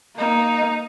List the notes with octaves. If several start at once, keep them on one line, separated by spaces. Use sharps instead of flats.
A#3 D#4